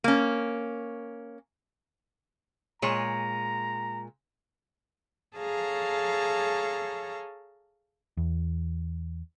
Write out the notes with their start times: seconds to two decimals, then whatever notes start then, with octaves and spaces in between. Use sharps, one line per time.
0.04 A#3 C#4
2.82 A#2 G#3 C#5 A#5
5.35 G#4 A4 C#5 F5 A5 A#5
8.17 E2